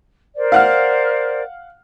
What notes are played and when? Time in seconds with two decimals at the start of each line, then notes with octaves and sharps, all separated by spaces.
0.36 A#4 C5 D5
0.52 F5 F#5 F6